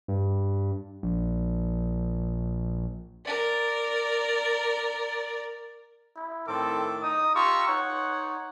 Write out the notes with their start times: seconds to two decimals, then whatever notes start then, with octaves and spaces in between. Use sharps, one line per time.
0.08 G2
1.03 A#1
3.26 A#4 D5
6.16 E4
6.48 A2 D#3 C4 A4 D6
7.03 D#4 D#5 D#6
7.35 F4 G4 A#5 C#6 E6
7.68 D#4 C#5 F#5